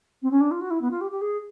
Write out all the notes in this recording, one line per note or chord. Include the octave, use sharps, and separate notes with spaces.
C4
C#4
D4
F4
F#4
E4
B3
F4
G4
G4
G#4